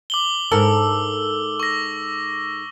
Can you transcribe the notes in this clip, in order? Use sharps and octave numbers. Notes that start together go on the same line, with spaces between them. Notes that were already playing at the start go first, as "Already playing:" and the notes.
D6 F#7 G7
G#2 A4 A#4 E6
C#6 A#6